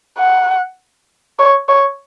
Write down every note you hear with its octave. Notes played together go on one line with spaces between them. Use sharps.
F#5
C#5
C#5